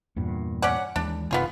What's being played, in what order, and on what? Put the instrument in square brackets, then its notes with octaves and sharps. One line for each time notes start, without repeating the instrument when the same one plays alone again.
[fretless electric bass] E2 G2 A#2
[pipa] C#4 D5 F#5
[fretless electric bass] D#2 E3 G#3 [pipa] D4
[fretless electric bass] F#1 C3 D#3 [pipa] B3 F4 G#4